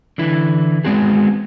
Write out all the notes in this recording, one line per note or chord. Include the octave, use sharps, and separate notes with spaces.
D3 E3 E4
G#3 B3 C4 F#4 G#4